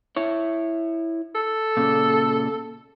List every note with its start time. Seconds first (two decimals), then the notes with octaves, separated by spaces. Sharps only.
0.16 E4 C#5
1.35 A4
1.77 A#2 C#3